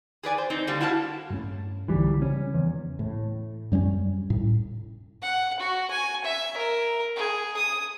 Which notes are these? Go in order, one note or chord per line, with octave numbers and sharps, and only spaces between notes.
G#4 B4 D5 G#5
C5
C4 D#4
D3 G3 A#3
E4 F#4 F5 F#5 A5
G2 A3 C#4
B1 D3 E3 G3
C#3 C#4
E2
A2
F#2 G3 A3 C#4
A2
F#5
F#4
G#5
E5
A#4
G#4
D#6